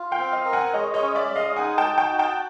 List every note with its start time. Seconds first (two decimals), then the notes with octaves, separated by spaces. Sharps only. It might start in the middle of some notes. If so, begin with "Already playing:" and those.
Already playing: F4
0.11 F5 G5
0.19 C4
0.32 D#5 F5
0.46 A#4
0.53 F#5 G#5
0.74 G#3 C#5 D#5
0.94 C#5 D#5
1.02 C#4
1.15 D5 E5
1.29 G#3
1.35 D#5 F5
1.56 D#4 F#5 G#5
1.78 G5 A5
1.85 F#4
1.98 G5 A5
2.12 F#4
2.19 G5 A5